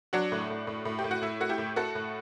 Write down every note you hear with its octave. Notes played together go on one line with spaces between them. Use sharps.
F#3 D4 F#4
A2
A2
A2
A2
G4
A2
F#4
A2 E4
A3 F#4
E4 G4
A2
A3 F#4 A4
A2